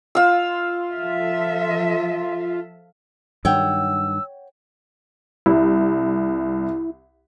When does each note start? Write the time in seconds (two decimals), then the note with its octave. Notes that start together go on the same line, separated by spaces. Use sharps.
0.15 F4 F5 E6
0.96 F3 A4 E5
3.45 G2 D#3 F#3 C#5 F#5 G5 E6
5.46 C2 E4